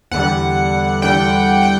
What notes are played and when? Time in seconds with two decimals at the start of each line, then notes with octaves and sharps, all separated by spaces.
0.11 E2 D3 G3 F#5
1.02 E2 D3 G3 G5
1.63 G5